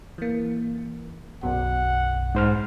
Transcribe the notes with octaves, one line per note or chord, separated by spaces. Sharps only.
E3 A#3
B1 F#2 B2 F#5
G#2 C5 F6